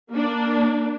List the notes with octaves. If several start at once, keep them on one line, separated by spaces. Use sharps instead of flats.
A#3 D4